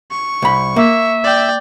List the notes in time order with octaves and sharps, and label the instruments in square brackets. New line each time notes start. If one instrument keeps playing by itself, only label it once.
[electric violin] C#6
[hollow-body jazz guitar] C2 B5
[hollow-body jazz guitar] A#3 [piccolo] E5
[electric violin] D5 G5